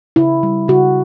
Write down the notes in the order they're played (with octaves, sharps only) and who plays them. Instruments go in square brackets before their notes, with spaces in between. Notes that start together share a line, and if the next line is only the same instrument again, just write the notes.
[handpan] C#3 E4
G3
C#3 F#4